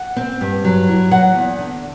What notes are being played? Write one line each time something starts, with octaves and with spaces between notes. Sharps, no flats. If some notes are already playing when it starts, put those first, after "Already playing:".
Already playing: F#5
C4
G2
F#3
E4
F#3 F#5
E2
D3